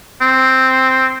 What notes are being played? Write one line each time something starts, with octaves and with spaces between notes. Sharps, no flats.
C4